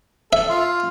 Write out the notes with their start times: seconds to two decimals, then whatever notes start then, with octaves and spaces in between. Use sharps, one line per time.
0.33 A4 E5
0.50 F4